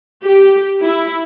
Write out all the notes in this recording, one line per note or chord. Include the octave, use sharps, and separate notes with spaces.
G4
E4